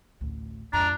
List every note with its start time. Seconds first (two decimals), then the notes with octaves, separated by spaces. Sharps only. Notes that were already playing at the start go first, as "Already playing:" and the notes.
0.21 A1 D2
0.73 F2 G#2 D4 A#5